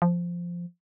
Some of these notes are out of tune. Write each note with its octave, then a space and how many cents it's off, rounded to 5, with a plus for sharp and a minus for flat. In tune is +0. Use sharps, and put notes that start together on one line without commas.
F3 -5